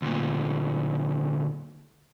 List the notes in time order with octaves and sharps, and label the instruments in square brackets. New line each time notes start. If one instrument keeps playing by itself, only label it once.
[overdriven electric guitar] D2 A#2